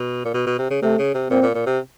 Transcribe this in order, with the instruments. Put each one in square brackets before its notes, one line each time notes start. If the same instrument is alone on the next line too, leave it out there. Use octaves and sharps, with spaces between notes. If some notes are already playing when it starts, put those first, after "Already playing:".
Already playing: [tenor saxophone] B2
A#2
B2
B2
C3
C#3
[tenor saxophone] C3 [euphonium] A3
[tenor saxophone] C#3
C3
[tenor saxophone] A#2 [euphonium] C4
[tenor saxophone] A#2
A#2
C3